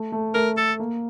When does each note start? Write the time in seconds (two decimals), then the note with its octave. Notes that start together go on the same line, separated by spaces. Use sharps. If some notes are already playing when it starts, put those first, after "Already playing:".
Already playing: A3
0.12 A3
0.34 A3 A#4
0.57 A4
0.79 A#3